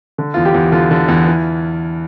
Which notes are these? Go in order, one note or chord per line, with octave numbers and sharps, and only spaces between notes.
D3
E2 F4
G4
E2
D3 F4
D3
E2
E3